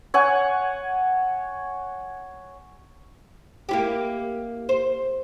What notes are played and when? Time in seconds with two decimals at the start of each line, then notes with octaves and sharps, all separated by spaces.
0.14 C#5 F#5 G#5
3.69 A#3 E4 G4
4.69 C5